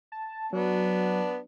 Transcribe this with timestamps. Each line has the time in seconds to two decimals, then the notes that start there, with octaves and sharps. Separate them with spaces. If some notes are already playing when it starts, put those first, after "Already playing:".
0.12 A5
0.53 F#3 B3 D4